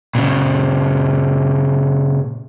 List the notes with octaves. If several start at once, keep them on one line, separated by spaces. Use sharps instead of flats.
A#2 C#3